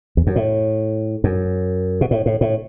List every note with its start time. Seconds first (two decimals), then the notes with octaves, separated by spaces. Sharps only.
0.17 E2
0.27 F#2
0.36 A2
1.24 F#2
2.01 B2
2.11 A2
2.26 A2
2.41 A2